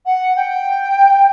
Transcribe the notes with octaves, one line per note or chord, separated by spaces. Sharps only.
F#5
G5